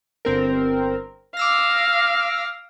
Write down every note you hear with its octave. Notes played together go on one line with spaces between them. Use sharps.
G1 C4 A#4
F5 D6 E6 A#6